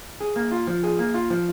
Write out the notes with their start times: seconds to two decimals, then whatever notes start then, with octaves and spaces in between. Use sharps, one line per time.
0.20 G#4
0.36 A#3
0.52 F4
0.67 F3
0.83 G#4
0.99 A#3
1.14 F4
1.30 F3